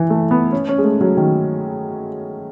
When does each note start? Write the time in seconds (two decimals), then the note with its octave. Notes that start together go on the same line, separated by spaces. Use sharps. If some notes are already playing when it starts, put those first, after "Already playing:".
Already playing: E3
0.10 A3
0.31 B3
0.52 C#4
0.69 C#4
0.79 G#3
0.84 A3
1.01 F#3
1.17 D#3